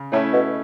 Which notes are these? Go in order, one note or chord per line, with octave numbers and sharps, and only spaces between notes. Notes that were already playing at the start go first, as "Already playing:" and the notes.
Already playing: C#3
A2 A3 C#4 E4
B2